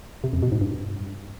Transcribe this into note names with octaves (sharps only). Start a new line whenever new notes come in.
C3
F2
B2
G#2
G2